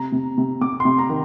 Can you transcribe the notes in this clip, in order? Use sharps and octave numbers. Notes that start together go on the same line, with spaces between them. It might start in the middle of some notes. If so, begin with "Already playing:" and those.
Already playing: C3 A#5
C3
C3
C3 D6
C6
C3
A#5
D#3